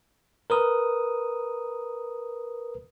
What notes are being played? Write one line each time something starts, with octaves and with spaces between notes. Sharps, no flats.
A#4 B4 D#6